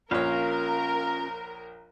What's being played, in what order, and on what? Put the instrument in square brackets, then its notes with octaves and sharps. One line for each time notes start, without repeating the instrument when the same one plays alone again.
[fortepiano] A#1 C#5 [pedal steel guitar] C#4 F5 [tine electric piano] F4 [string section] A#4